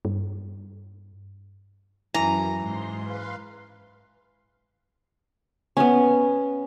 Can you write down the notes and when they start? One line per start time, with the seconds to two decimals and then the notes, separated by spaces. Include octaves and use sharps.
0.05 G2
2.14 F#2 E3 A#5
2.59 G#2 C6
3.03 B4 F5 C6
5.77 B3 C#4